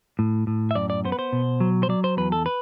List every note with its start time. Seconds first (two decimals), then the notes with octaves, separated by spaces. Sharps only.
0.19 A2
0.47 A2
0.71 E5
0.75 F#2 D5
0.90 D5
1.05 B3 C5
1.12 B4
1.19 C5
1.33 B2
1.61 F#3
1.83 C5
1.89 F#3 D5
2.04 C5
2.17 E2 B4
2.32 A4
2.46 B4